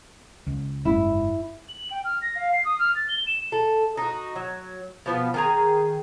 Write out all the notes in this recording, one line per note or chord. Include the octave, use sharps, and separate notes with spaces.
C#2
F#1 G#2 E4
F#7
G5
F6
A#6
F5
C7
D#6
F6
A6
G7
E7
A4
D#4 F#4
F#3
B2 F3 B3
D#3 G#4 A#5